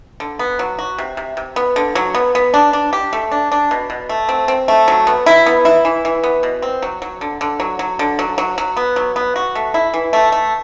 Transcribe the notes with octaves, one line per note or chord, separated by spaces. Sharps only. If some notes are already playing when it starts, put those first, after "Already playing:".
D3
B3
F#3
F#4
C3
C3
C3
B3
D3
F#3
B3
B3
D4
D4
G4
A3
D4
D4
B2
B2
A3
C4
C4
A3
F#3
B3
E4
B3
E4
E3
E3
B3
B2
C4
F#3
F#3
D3
D3
F#3
F#3
D3
F#3
F#3
F#3
B3
F#3
B3
F#4
A3
E4
E3
A3
A3